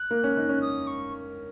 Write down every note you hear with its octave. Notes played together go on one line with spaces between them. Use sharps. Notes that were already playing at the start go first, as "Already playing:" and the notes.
Already playing: F#6
A#3
C#4
D#4
C#4
D#6
C#6